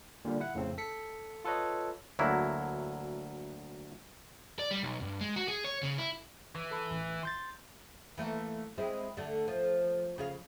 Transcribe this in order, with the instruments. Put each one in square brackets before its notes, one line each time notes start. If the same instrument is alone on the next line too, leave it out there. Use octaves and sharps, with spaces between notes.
[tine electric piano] A#2 D3 G3
E4 F#5
F2 A2 C#3 C4
A4 B6 C#7
F4 A4 B4 C#5 D#5
[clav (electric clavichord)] D2 F#3 A#3 E4
[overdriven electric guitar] D5
G3
B1
G2
G#3
F#4
G#4
C#5
C#3
E4
[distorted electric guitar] E3
[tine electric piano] A4 B5
A1
C6 G6 A6
[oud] E3 A3 A#3
G#3 C4 E4
D3 A3
F3
C#3 G#4 F5